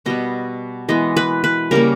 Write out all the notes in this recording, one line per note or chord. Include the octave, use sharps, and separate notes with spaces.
B2 G3 B3 D#5
E3 G#3 B3 D#5
B4
B4
C#3 G3 A#3 A#4